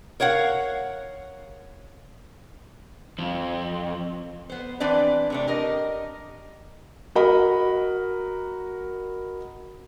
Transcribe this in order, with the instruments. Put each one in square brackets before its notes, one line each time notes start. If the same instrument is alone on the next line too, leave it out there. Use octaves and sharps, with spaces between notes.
[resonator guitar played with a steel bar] A#4 C#5 F5 F#5
[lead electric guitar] F2
[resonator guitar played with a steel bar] B3 C5
E3 C4 D4 B4 D5
C3 A3 D4
G4 A#4 D#5
[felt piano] F#4 A#4 D#5 B5